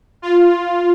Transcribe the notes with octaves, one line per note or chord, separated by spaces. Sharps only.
F4